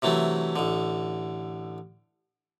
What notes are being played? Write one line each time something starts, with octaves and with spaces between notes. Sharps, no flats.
C3 E3 F#3 A3
A1 D3